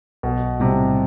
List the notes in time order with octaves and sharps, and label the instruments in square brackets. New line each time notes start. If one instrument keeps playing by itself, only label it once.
[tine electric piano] B1 [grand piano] B2
[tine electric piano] A2 G3 [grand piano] C3